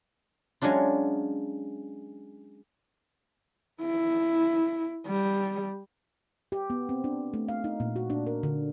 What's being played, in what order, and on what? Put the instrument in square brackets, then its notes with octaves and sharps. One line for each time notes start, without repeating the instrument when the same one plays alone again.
[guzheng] F#3 G#3 C#4 D4 F4
[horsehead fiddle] E4
G3
[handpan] G4
B3
C4
D4
A3
F5
D#4
A#2
F#4
D4
A#4
D3